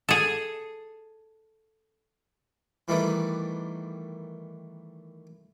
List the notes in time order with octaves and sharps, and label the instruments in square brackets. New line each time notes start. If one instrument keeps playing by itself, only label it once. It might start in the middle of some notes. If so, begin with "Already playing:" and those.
[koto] G#4 A4
[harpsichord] D#3 E3 G3 A3 B3 D4